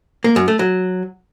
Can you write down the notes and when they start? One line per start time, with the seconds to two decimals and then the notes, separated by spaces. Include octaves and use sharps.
0.24 A#3
0.36 F#2
0.48 A3
0.59 F#3